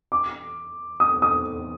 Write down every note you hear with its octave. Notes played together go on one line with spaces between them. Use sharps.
D6
D#6
D#6